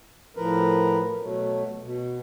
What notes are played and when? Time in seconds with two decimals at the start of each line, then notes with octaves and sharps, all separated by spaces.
0.37 A2 F3 A#4 B4
1.22 B2 F#3 A3
1.83 B2